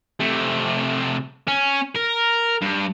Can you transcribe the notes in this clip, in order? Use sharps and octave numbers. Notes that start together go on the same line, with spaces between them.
C3 A3
C#4
A#4
G2